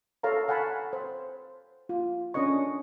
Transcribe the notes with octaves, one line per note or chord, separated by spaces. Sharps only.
A4 A#4 C#5 F5 A5 A#5
F5 F#5 G#5 A5 B5
C5
F4
C#4 D4 A#4 D#5 C#6